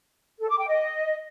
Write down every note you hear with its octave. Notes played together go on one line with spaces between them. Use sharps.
A4
D6
G5
D#5